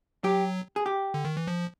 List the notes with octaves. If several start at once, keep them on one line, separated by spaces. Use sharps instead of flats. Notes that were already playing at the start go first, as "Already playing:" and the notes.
F#3 G4
G#4
G4
D3
D#3
E3
F3